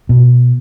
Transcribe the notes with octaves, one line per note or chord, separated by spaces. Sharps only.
B2